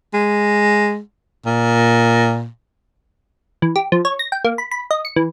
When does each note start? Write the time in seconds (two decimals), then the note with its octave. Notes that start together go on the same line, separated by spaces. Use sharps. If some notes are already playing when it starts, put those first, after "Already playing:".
0.13 G#3
1.46 A#2
3.62 E3
3.76 G4
3.92 F3
4.05 C#5
4.19 A#6
4.32 G5
4.45 A#3
4.58 B5
4.71 B5
4.91 D#5
5.05 C#7
5.16 E3